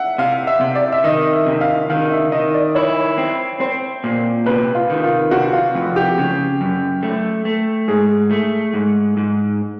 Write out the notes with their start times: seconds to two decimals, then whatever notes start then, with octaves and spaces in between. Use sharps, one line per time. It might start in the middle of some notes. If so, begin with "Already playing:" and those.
Already playing: E5 F#5
0.18 C3 F5
0.47 E5
0.61 C3
0.75 D5
0.92 E5
1.04 D#3 D#5
1.33 E5
1.46 C3
1.61 F5
1.90 D#3 F5
2.12 E5
2.32 D#3 D#5
2.54 D5
2.75 E4 C#5
3.18 C4
3.60 C4 C5
4.04 A#2
4.46 C3 B4
4.75 F4
4.90 D#3
5.03 F4
5.31 C3 F#4
5.53 F4
5.74 F2
5.96 G4
6.18 C#3
6.61 F#2
7.03 A3
7.45 A3
7.88 G#2 G#4
8.31 A3
8.74 G#2
9.17 G#2